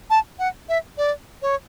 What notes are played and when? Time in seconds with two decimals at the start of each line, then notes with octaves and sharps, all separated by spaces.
0.10 A5
0.39 F#5
0.69 E5
0.98 D5
1.42 C#5